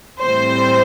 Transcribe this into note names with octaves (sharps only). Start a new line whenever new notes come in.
A2 E3 G3 C4 C5